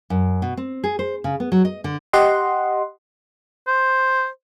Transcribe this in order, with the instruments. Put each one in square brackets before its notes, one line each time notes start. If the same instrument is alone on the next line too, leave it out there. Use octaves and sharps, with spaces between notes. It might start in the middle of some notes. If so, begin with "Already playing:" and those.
[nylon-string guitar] F#2
B2
C4
G#4
C5
C#3
B3
F#3
D#5
D3
[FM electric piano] G4 D#5 F#5 C6
[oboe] C5